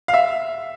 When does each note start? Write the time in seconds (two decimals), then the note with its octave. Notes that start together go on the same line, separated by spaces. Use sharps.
0.08 F5
0.14 E5